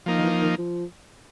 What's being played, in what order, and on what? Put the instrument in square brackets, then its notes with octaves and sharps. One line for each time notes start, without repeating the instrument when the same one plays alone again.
[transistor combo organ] F3 A#3 D#4
[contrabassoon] D#3
E3
D#3
F3